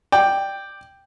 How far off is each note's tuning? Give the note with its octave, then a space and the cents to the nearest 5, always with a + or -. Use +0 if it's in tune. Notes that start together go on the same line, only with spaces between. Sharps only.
D5 +10 G5 +0